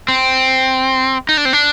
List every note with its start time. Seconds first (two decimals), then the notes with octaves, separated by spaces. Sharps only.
0.08 C4
1.29 D#4
1.37 D4
1.45 C4
1.53 D4